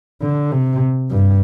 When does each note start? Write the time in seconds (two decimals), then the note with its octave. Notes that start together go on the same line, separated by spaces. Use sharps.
0.22 D3
0.52 C3
1.11 G2